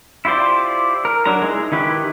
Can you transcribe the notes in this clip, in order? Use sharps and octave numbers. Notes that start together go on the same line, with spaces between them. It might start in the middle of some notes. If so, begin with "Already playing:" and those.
E4 F4 G4 C5 D5
A#4
F#3 D4 A#4 A#5
G#3 D#4 E4
D#3 E4 G4 B4